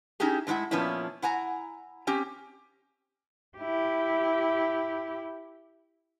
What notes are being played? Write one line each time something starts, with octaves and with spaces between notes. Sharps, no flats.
C#4 D#4 E4 G4 G#4
A2 D3 G#3 E4 F#5
A#2 F3 B3 C#4 D4 E4
E4 F#5 G#5 A#5
C4 C#4 G4
E4 G4